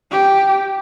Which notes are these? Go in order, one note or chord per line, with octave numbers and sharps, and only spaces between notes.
G4